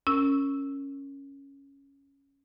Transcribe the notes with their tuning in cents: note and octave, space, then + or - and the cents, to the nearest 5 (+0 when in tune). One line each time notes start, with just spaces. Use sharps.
C#4 +0 A#4 -15 E6 +0